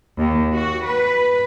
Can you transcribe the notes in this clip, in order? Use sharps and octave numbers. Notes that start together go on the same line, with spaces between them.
D#2
F#4
B4